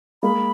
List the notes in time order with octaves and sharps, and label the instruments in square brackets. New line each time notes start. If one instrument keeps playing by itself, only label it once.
[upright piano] G#3 A#3 [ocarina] B5